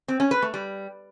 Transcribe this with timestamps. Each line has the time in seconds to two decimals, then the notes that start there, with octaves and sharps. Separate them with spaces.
0.08 C4
0.20 C#4
0.31 B4
0.42 A3
0.54 G3